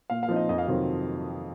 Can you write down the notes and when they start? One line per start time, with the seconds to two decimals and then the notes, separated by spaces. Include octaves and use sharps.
0.10 A#2 F5
0.23 F5
0.28 F3 C4 D#4
0.36 D#5
0.49 F2 D#5
0.58 F5
0.68 C3 D#3 F#3 C4 D#5